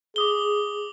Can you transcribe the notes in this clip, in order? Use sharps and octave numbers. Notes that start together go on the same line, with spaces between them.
G#4 D6 D#6 G7